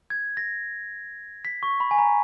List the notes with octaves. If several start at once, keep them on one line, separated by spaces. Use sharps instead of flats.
G#6
A#6
B6
C#6
B5
G#5
A#5